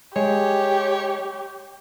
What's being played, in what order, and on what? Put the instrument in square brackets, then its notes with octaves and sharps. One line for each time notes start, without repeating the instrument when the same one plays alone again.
[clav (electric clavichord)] G#3 [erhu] G4 [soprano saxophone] C#5